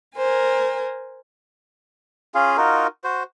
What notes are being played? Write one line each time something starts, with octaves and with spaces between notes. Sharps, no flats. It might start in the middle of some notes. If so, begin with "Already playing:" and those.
A#4 C5 G#5
C#4 F4 G#4 F5
D#4 F4 F#4 A#4
F#4 C5